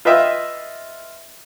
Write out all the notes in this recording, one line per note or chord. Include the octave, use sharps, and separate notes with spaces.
F4 B4 D#5 E5 G5